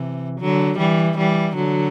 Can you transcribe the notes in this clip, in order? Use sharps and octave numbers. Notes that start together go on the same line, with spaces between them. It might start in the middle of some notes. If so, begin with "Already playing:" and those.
Already playing: C3 E3
D3 F#3
E3 G3
E3 G3
D3 F#3